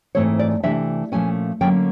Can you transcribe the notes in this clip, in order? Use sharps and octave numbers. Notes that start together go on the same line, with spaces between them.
G#2 E3 A3 C4 C#5
D5
C3 E3 A3 D4 E5
A#2 F3 A3 C#4 G#5
D3 F#3 A#3 C#4 G5